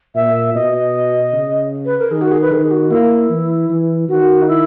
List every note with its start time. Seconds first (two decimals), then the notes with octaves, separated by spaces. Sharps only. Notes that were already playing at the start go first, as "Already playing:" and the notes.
0.15 A#2 E5
0.55 B2 D#5
0.74 D#5
1.33 C#3
1.85 B4
1.99 A#4
2.11 D#3 G#4
2.21 F#4
2.32 G#4
2.42 B4
2.51 D#3 G#4
2.64 G#4
2.71 F#4
2.91 A#3 E4
3.30 E3
3.70 E3
4.08 D#3 F#4
4.42 D#4
4.48 E4